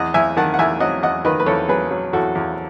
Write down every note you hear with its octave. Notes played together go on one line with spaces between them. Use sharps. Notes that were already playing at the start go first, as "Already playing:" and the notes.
Already playing: E2 D#5 F#5
E2 E5 G#5
D#3 F#5 A5
F#5
E2 E5 G#5
F#3 D#5 F#5
E2 D#5 F#5
D#3 B4 D#5
B4
E2 A4 C#5
F#3 G#4 B4
F#3
E2 F#4 A4
E2